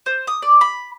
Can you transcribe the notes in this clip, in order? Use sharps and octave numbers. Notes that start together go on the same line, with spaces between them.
C5
D#6
D5
B5